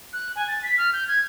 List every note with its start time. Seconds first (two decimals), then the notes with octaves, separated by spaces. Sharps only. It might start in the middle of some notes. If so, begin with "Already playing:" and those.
0.13 F#6
0.36 G#5
0.48 A6
0.63 B6
0.78 F6
0.93 G6
1.08 G#6